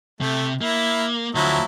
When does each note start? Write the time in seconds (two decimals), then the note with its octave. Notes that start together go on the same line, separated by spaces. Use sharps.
0.21 C3 A3
0.61 A#3 E4
1.35 D2 F3 F#3 E4